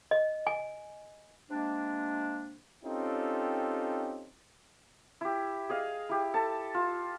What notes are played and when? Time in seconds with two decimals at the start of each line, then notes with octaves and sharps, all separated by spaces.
0.11 D#5
0.47 G#5
1.50 C3 G#3 A#3 D4
2.84 C4 C#4 D#4 F4 G4 A4
5.21 E4 G4
5.69 G#4 D#5 F5
6.09 E4 G4
6.34 A4 A5
6.74 F4